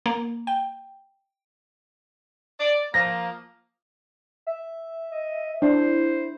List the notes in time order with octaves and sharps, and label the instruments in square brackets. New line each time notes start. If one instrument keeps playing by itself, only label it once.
[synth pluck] A#3
G5
[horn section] D5
[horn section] F3 A#3 [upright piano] A#6
[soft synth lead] E5
[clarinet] D#5
[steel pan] D4 [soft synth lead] E4 [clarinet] C5